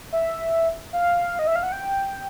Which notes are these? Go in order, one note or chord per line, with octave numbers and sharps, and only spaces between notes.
E5
F5
D#5
E5
F5
F#5
G5